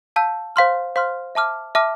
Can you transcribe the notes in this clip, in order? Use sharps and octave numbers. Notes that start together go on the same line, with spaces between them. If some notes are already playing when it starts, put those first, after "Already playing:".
F5 A5 E6 G6
C5 F5 C6 F6
C5 F5 C6 F6
E5 A5 D6 F6
E5 A5 D6 F6